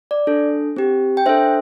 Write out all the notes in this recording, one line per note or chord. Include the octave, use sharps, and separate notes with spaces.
D5
D4 A4
C4 G4
G5
D4 A4 C5 E5